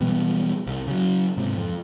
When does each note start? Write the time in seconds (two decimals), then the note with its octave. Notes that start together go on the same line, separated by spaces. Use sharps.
0.01 B2 E3 G3 B3
0.67 C2
0.87 C#3 F#3
1.37 G#2 C3
1.57 F2